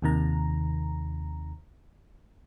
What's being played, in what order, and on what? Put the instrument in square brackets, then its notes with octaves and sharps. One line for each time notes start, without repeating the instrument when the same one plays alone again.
[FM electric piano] D#2 C3 D#3 A#5